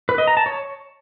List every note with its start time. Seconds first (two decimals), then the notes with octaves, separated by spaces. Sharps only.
0.09 B4
0.18 D#5
0.27 A#5
0.37 A5
0.46 C#5